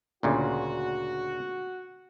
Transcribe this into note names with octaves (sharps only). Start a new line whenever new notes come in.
D2 A#2 C#3 F#4